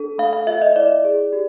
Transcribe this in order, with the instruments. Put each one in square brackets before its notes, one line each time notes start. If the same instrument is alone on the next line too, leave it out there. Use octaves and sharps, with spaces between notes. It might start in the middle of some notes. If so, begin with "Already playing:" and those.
Already playing: [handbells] D4 A4
A3 F5
F5
F4 E5
D#5
E4 D5
G#4
G4